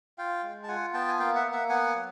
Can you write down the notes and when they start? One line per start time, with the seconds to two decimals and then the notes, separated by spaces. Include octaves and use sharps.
0.18 F4 F5 G5
0.43 G#3
0.63 A5
0.68 F4 F#5 G#5
0.94 B3 G5 A5
1.08 G#5
1.19 A#3 F5 G5
1.35 E5 F#5
1.44 A#3
1.52 E5 F#5
1.69 B3 F#5 G#5
1.95 F#3